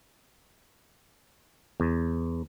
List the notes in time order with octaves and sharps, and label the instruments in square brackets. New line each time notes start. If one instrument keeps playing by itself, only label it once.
[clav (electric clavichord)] E2